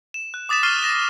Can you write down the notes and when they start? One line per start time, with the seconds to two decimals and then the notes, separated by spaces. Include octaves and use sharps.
0.14 E7
0.34 F#6
0.49 D6 D#6 A6 B6 E7
0.63 C#6 F6 A6 C7 D#7 G7
0.83 A6 A#6 E7